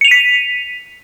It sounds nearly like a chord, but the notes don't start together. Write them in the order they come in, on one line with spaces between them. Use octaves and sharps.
C#7 F7 D#7 B6